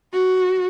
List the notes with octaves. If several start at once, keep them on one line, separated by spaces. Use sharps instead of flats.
F#4